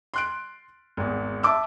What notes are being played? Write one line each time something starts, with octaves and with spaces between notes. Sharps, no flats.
C6 F#6 D7
G#1 E2
E5 A5 D6 E6